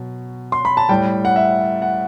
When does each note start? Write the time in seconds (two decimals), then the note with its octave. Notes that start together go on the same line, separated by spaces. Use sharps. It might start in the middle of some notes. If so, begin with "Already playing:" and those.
Already playing: B2 F#3
0.52 C6
0.65 B5
0.77 A5
0.89 A2 G3 G5
1.25 F#5
1.36 E5
1.82 F#5